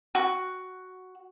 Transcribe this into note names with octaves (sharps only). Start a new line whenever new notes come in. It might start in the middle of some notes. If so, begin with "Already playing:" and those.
F#4